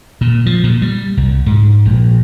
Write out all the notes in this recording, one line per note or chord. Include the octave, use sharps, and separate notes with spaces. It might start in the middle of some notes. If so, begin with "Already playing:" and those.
A#2
F3
A#2
G3
C2
G#2
A#1